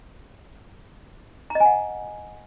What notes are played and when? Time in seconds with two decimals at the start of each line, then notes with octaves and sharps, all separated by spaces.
1.50 A#5
1.55 D#5
1.60 G#5
1.65 F#5